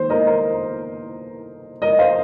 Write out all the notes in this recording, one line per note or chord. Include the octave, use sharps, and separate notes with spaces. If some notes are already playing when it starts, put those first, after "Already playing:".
Already playing: D#3 A#3 C5
A#4 D#5
A#4
A#4 D#5
C5 F5